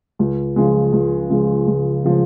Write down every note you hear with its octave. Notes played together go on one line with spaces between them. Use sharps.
C#2
C#3 F3 G#3
C#2
C#3 F3 G#3
C#2
C#3 F3 G#3